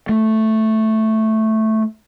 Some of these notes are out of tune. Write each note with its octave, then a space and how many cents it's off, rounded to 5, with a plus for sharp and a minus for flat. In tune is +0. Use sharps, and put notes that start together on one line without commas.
A3 +0